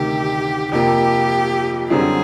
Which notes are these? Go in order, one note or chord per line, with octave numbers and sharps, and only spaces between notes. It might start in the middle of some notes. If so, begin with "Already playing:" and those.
Already playing: D2 C3 D#3 G4
F2 C3 F3 A#3 G4
F#2 D3 G3 C4 E4 G#4